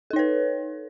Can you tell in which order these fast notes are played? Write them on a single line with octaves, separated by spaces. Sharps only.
A4 D#4 C#5 B4